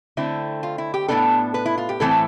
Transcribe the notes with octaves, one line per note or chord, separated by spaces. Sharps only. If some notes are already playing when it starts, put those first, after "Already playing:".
D3 A3 C4 E4
F4
E4
G4
A2 E3 B3 D4 A4
B4
E4
F4
G4
A2 E3 A3 C4 A4